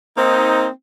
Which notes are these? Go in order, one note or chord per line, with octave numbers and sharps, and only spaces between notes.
A#3 C4 D#4